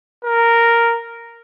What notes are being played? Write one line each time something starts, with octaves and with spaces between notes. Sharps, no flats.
A#4